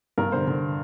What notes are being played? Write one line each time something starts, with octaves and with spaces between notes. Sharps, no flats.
G2 A#4
D3 C5
D3